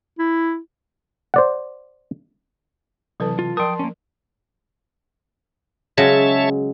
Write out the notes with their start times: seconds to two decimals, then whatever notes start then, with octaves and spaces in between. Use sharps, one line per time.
0.19 E4
1.34 C5 D5 F#5
3.20 C3 E3 F#3 A4 B4 A5
3.39 F4
3.57 F3 A#4 G5 A5 C6 D#6
3.79 A#3 C#4
5.98 C#3 F#3 G#3 G#4 C#5 E5 A5